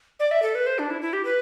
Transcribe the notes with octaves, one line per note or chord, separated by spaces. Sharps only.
D5
E5
A4
B4
C5
D4
E4
E4
G4
B4